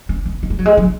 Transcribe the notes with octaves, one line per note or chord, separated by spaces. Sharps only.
C#4
B3
A#3
G#3
F#3
G#3
F#3